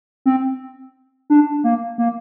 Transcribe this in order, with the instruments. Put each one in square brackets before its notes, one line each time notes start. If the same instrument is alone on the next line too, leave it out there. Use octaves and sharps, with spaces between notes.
[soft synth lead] C4
D4
A#3
A#3